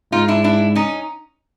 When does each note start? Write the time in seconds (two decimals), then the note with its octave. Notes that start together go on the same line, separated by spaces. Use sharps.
0.12 G#2 D#4 F4
0.28 D4 E4
0.44 D4 E4
0.75 C#4 D#4